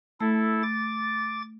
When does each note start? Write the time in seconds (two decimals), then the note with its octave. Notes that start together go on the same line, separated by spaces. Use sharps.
0.21 A3 E4 A4
0.63 D6 A6